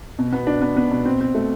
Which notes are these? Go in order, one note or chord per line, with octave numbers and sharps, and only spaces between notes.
B2
B3
D4
B3
B3
B2
C4
C4
A3